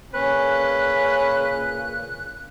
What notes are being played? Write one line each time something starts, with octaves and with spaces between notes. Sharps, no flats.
A#2 C#3 C#4 B4 F#6